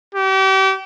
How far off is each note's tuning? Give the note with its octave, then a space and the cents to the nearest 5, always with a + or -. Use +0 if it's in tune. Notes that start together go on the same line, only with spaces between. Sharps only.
G4 -35